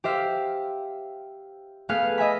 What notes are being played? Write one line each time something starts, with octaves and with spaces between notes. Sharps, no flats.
G4 C5 E5 F5
A3 B3 G#4 B4 F5
D#5 E5 G#5 B5